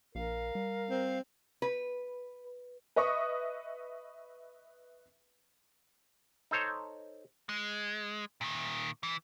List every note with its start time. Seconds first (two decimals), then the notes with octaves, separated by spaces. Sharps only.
0.15 A#1 A#4 F5
0.55 G3
0.90 C4
1.62 B4
2.96 B4 D#5 E5 C#6 D#6
6.51 D#4 A4 C5 C#5
7.49 G#3
8.41 A#2 D#3
9.03 E3